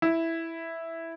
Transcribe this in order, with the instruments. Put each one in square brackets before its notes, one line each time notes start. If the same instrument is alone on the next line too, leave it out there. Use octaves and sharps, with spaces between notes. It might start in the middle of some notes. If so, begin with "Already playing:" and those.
[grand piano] E4